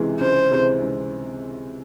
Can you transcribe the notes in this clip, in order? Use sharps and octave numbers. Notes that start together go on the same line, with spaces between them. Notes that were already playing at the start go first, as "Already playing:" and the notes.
Already playing: C#2 C3 E3 G#3
C#2 C5
C3 E3 G#3
C#2